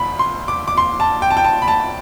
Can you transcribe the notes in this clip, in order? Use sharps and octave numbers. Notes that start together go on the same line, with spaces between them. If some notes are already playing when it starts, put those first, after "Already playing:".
Already playing: E1 D2 B5
C6
D6
D6
C6
A5
G5
A5
G5
A5
B5
A5